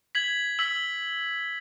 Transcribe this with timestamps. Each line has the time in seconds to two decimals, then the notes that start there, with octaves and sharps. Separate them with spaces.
0.15 G#6 B6 F#7
0.59 E6 B6 F#7